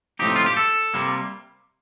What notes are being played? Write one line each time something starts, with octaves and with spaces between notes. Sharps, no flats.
A2 F3 C4 D#4 G4
F4
G4
A4
C3 G3 A#3